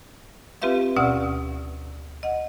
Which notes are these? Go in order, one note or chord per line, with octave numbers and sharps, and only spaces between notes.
C4 F4 G4 B4 E5 F5
D2 B2 C#4 D5 F#5 E6
D#5 F#5